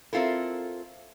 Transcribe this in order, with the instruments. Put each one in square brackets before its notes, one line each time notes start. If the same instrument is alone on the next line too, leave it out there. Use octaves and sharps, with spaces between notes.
[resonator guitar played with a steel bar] C4 E4 F4 A4 A#4